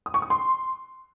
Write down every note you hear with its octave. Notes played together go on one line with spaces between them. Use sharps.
D#6
C#6
D#6
C6